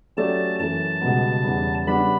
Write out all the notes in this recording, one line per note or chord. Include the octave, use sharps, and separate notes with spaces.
F#3 A3 C#4 G4 D5 A5
F#2 E3 A3 A5
C#2 B2 G3 B3
E2 C#3 G3 B3
C#3 G3 B3 D4 B5